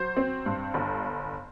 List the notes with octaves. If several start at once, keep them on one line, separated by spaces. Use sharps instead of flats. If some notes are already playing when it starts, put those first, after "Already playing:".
Already playing: F#3 C5
C4
G2
G1